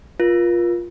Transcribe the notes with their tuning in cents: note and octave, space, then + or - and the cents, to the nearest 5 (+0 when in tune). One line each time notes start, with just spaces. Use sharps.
F4 +0 A#4 +40